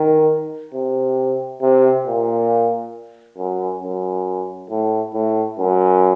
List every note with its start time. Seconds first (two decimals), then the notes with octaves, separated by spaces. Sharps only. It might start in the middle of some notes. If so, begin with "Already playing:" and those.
Already playing: D#3
0.74 C3
1.62 C3
2.06 A#2
3.38 F#2
3.83 F#2
4.70 A2
5.14 A2
5.59 F#2